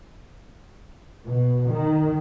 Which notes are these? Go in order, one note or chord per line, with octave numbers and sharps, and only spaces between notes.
B2
D#3